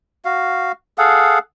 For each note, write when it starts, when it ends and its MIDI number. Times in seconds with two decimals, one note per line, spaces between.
0.25 0.72 66
0.25 0.72 77
0.98 1.39 68
0.98 1.39 69
0.98 1.39 77
0.98 1.39 78